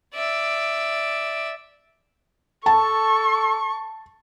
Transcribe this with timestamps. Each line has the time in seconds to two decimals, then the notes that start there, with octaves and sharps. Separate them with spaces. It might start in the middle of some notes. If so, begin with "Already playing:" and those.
0.14 D5 E5
2.66 A4 A5 C#6